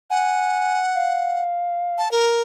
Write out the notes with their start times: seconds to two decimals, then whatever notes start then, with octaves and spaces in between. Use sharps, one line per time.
0.10 F#5 G#5
0.95 F5
1.98 A5
2.11 A#4